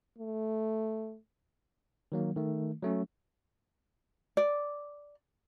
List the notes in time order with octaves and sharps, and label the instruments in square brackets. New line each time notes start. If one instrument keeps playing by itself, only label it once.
[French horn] A3
[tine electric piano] D#3 F#3 A#3
D#3 A3
F#3 A3 C#4
[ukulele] D5